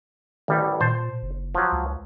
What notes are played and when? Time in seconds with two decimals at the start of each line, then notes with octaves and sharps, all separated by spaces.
0.48 A1 D2 D#3 G3
0.81 A#2 C5 A5
1.22 F#1
1.55 F3 F#3
1.72 C#2